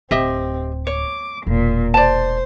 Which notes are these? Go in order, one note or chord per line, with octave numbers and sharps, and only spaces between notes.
D1 C4 G4 D#5 E5
C#5 D6
E1 A#2
C5 D5 A5